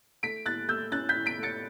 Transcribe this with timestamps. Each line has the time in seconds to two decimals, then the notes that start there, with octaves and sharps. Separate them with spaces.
0.23 A3 B6 D7
0.46 A2 F#6 A6
0.68 A3 E6 G6
0.92 C#4 F#6 A6
1.09 G6 B6
1.14 A2
1.26 B6 D7
1.38 A3
1.43 A6 C#7